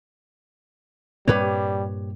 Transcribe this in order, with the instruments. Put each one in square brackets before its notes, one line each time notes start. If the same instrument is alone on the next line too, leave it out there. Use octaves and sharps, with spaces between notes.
[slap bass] G2 A#2 C4 [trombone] G3 [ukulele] G4 B4 C#5